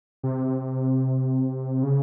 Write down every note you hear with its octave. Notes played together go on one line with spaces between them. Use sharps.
C3
C#3